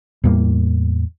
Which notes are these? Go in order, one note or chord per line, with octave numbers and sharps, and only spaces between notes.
E2 A2 G3 A#3